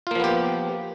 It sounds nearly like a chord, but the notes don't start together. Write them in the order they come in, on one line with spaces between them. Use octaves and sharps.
F4 A#3 F3 B3 G4